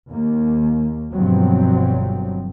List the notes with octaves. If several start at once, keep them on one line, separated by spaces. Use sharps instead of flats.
D#2 A#3
G1 G2 B2 F3 F#3 C4